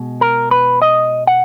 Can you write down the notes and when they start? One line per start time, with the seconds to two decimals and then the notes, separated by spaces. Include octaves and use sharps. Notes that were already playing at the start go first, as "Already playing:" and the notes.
Already playing: B2 G#3
0.21 A#4
0.51 B4
0.82 D#5
1.27 F#5